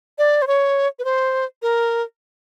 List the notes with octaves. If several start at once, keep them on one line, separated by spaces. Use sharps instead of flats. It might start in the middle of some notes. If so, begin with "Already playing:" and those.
D5
C5
C#5
B4
C5
A#4